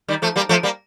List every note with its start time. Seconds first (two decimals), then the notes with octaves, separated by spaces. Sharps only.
0.08 D#3 G3
0.22 F3 A3
0.36 G3 A#3
0.49 F3 A3
0.63 G3 A#3